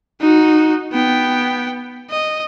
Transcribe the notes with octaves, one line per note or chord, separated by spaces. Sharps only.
D#4 F#4
B3 G5
D#5